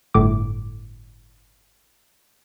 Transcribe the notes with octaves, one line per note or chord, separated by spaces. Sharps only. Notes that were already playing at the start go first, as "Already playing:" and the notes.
G1 A2 D6